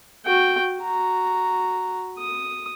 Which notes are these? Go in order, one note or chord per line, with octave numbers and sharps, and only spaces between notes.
F#4 G5
F#4 A#5
D#6